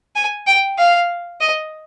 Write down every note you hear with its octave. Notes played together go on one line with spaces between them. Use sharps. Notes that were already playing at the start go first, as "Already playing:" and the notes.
G#5
G5
F5
D#5